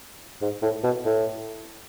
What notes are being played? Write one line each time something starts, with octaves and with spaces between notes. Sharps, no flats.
G#2
A2
B2
A2